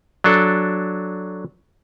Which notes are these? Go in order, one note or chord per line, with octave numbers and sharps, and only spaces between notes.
F#3 D4 A4